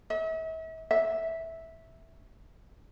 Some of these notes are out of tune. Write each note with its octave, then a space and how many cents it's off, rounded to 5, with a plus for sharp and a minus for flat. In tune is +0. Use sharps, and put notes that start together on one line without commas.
E5 -40
E5 -10